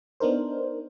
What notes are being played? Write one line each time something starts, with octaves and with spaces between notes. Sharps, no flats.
B3 D4 D#4 A#4 C5